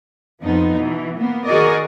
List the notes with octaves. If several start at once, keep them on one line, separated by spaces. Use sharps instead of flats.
F2 F3 B3 D#4
B2 E3
A#3 B3
D#3 F#4 G#4 A#4 D5 D#5